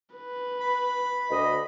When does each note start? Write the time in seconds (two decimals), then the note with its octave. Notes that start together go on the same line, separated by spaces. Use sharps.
0.15 B4
0.60 B5
1.30 D2 D3 D#5